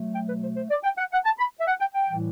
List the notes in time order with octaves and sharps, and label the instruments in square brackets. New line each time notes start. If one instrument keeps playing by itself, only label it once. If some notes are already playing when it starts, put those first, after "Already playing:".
Already playing: [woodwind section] B2 F#3 A3
G5
B4
C5
C5
D5
G5
F#5
F#5
A5
B5
E5
F#5
G5
G5
A2 E3 G3